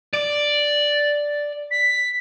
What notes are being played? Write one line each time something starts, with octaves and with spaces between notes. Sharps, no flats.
D5
B6